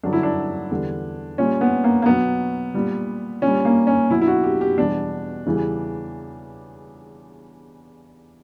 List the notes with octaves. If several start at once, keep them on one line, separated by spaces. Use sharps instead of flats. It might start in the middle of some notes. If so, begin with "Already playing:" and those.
G2 D3 F#3 D4
E4
D4
E2 D3 G3
A#2 G3 C#4
B3
A#3
A#3
B2 F#3 B3
A#2 G3
A#2 C#4
G3
A#3
C#4
B2 F#3 E4
E4
F#4
G4
G4
E2 B2 G3 D4
E2 C#3 E3 G3